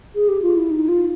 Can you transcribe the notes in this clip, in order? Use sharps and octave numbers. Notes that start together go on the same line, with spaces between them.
G#4
G4
F4
E4
D#4
F4